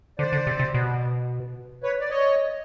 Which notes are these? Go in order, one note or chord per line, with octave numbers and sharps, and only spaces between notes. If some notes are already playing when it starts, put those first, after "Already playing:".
D3 C5 D5
D3
C3
C3
B2
B4 C#5
D5
C#5 D#5